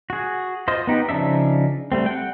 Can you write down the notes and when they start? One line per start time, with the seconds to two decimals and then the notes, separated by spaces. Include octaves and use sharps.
0.10 F#4 G#4
0.68 F4 C5 D#5
0.87 B3 D#4 G4
1.09 C#3 F3 D4 D#4 E5
1.92 G3 A3 C4
2.06 F#5 G5